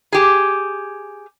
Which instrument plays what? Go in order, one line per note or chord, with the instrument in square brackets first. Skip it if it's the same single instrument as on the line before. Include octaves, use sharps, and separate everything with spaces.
[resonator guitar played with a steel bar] G4 G#4